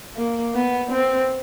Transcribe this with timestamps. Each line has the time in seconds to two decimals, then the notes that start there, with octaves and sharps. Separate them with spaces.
0.17 A#3
0.55 B3
0.92 C4